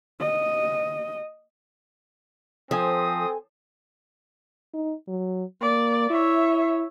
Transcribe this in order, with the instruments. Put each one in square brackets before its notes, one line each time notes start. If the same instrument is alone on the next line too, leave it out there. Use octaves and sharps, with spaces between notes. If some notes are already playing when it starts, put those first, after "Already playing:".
[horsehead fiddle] D#5
[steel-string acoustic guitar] F3 [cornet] C4 [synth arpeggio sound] A4 G#5 [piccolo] D#6
[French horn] D#4
F#3
[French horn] A#3 [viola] D5
[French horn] E4 [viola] C#5 E5